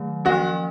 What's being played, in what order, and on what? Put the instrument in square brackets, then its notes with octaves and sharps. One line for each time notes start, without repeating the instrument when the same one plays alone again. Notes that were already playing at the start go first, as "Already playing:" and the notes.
Already playing: [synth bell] D#3 F#3 A3
[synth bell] F3 A#3 C#4 [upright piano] F#4